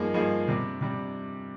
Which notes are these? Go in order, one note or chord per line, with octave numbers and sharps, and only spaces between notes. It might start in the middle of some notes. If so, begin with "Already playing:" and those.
Already playing: G2 F3 A#3 D#4 G#4
G2 F3 A#3 D#4 G#4
C3 G3 D4
C3 G3 D4